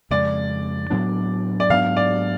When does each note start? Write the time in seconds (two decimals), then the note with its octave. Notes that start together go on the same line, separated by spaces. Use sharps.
0.11 F2 C#3 G#3 D5
0.91 A2 F#3 B3 D4
1.60 D5
1.69 G#2 F#3 B3 D4 F5
1.97 D5